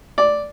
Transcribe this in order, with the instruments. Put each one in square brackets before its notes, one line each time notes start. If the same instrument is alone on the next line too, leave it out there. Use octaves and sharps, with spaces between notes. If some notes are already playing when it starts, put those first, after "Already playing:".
[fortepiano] D5